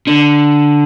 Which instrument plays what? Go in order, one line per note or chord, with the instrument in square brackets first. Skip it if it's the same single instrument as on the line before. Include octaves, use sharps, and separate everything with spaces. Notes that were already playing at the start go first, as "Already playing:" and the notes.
[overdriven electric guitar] D3